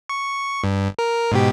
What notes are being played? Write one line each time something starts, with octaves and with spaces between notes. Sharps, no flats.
C#6
G2
A#4
G#2 B2 G4